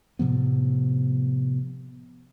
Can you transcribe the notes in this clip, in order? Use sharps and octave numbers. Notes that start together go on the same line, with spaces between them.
A2 C3 F3 B3